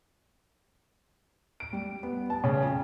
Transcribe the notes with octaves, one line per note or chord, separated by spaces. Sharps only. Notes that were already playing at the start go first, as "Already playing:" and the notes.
D7
G3
B3
A5
C#3
F2